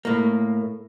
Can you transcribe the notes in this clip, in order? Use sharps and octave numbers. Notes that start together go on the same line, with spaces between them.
A2 A#3